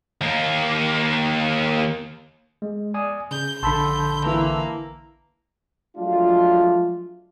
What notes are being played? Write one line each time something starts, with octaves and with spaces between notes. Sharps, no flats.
D#2 A#3
G#3
D5 G#5 D#6
C#3 G6
A#1 D3 A5 B5 C6 E6
E3 A#3
F3 F#3 G#3 A3 D4 F4